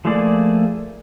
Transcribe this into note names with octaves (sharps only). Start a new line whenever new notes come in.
F3 A3 A#3 G#4 D5